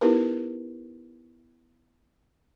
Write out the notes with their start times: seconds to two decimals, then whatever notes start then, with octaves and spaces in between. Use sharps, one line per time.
0.01 B3 D#4 E4 G4 A#4 B4